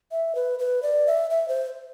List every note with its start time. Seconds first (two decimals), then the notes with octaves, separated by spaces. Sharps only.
0.12 E5
0.35 B4
0.59 B4
0.83 D5
1.07 E5
1.30 E5
1.48 C5